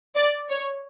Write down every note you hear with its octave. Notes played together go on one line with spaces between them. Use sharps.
D5
C#5